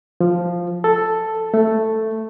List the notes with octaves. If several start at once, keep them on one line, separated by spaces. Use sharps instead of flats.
F3
A4
A3